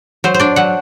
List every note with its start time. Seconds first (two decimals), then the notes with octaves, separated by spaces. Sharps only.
0.24 F#3 C5
0.34 C5
0.40 D4 D5
0.56 F#3 F#5